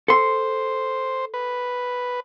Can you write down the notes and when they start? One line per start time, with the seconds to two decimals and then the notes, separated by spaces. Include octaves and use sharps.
0.08 A4 C5 C6
1.34 B4